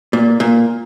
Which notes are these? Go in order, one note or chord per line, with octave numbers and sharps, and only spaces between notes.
A#2
A#2